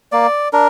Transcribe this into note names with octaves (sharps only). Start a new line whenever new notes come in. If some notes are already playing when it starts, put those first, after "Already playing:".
A#3 D5
D4 A#4